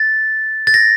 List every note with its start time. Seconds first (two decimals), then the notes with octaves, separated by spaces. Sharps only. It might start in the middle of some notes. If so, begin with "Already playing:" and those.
Already playing: A6
0.67 A6
0.74 A#6